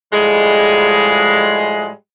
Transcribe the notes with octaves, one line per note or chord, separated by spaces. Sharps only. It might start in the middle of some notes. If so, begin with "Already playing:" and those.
A2 F3 G3 G#3